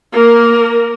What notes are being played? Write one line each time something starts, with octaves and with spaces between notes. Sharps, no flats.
A#3 A#4